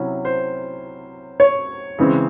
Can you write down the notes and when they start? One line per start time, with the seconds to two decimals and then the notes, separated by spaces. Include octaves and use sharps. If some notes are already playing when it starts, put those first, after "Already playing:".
Already playing: C3 F#3 C#4 E4
0.25 C5
1.40 C#5
1.99 C#3 E3 G#3 C4